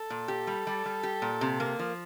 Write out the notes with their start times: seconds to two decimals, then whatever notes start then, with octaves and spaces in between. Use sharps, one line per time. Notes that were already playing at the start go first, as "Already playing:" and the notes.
Already playing: A4
0.10 A#2
0.28 G4
0.47 G3
0.67 G3
0.86 G3
1.03 G4
1.22 A#2
1.41 C3
1.60 A#3
1.79 F3